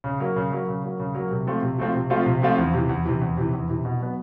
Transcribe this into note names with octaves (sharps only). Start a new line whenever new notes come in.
C#3
F#3 A#3
C#3
F#3 A#3
C#3
F#3 A#3
C#3
F#3 A#3
C3
F3 A3 C4 F4
C3
F3 A3 C4 F4
C3
F3 A3 C4 F4
C3
F3 A3 C4 F4
E2
C3 E3
E2
C3 E3
E2
C3 E3
E2
C3 E3
B2
F#3 B3